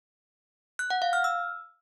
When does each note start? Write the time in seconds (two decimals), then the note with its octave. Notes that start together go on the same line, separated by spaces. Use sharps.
0.79 F#6
0.90 F#5
1.02 F5
1.13 F6
1.24 E6